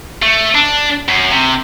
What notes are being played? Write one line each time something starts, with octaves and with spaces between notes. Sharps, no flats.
A3
D4
F#2
C3